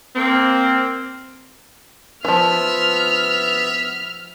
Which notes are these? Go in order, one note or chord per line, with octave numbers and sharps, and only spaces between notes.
A#3 C4
E3 F3 B3 E5 F6